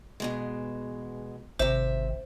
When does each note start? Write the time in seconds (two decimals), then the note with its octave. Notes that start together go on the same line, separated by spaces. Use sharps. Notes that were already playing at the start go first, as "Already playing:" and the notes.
0.20 E2 B2 G#3
1.59 G#1 C3 C5 E5